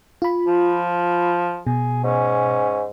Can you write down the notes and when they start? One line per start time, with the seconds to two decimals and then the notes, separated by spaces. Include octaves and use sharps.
0.22 F4 B5
0.47 F3
1.67 B2 G#4
2.04 G#2 C#4